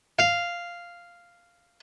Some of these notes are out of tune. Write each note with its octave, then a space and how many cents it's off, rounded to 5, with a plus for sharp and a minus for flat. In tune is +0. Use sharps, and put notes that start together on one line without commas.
F5 -5